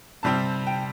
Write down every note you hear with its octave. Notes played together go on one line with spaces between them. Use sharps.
C3 G3 C4 A5
G5